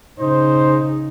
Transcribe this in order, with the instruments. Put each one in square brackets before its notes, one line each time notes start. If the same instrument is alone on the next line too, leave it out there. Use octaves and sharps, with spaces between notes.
[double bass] C#3 D#4 [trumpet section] C5